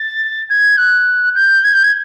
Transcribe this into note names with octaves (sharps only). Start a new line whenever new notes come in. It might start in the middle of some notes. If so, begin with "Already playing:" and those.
Already playing: A6
G#6
F#6
G6
G#6
G6
G#6